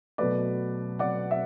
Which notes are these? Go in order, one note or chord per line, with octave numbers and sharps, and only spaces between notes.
B2 F#3 A3 B4 D5
D5 F#5
E5